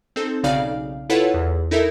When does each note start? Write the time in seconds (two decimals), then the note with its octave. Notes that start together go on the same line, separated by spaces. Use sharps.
0.16 C4 D#4 A4
0.43 B1 C#3 D#4 D5 F5 F6
1.10 E4 F4 A4 B4 C#5 F#5
1.34 E2
1.71 D#4 E4 A4 A#4 E5